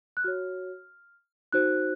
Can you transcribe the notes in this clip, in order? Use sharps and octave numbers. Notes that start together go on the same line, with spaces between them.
F#6
F#4 C#5 F6
D#4 F#4 C5 F#6